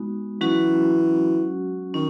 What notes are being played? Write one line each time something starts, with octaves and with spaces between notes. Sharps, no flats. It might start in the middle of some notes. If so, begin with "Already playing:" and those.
Already playing: G#3 B3 D#4 F#4
E3 F#3 C#4 F#4
D#3 C#4